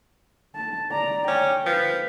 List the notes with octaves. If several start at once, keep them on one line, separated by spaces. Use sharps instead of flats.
A5
D5 A#5
C#4 G5
F3 B4